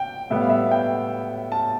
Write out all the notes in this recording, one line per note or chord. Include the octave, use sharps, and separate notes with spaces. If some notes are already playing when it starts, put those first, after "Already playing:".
Already playing: G5
A2 G3 B3 E5
F5
E5
G5
A5